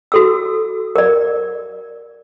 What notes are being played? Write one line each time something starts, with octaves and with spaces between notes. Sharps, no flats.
F#4 A4 E6
A#4 D5